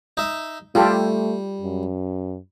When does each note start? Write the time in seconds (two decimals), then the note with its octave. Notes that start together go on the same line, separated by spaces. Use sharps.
0.17 D#4 E5
0.75 G3 A3 F4 G4 A4
1.61 F#2